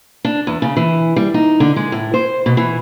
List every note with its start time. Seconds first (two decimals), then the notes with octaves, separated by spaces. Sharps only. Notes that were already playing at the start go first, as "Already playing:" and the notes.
0.25 D4
0.47 E2
0.62 C#3
0.77 E3
1.16 G3
1.34 D#4
1.60 D3
1.76 G#3
1.92 A2
2.14 C5
2.46 B2
2.57 E3